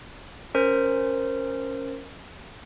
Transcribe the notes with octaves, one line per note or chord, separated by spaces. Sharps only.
C#4 A#4 C5